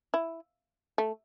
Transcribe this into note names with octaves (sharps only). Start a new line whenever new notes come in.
E4
A3